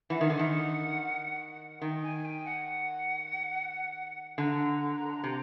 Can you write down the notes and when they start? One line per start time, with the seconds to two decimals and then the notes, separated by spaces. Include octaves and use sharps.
0.10 E3 F#5
0.21 D#3
0.30 D3
0.39 D#3
1.82 D#3 G5
2.03 G#5
2.25 G5
2.45 F#5
4.38 D3 A#5
5.24 C3